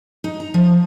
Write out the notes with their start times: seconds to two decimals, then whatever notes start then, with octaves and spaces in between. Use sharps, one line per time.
0.24 D#4
0.40 A#5
0.54 F3